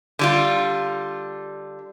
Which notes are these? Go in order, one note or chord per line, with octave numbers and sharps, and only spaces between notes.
D3 G3 F4